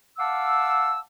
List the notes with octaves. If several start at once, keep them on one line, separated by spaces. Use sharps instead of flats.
F5 F#5 A5 D6 E6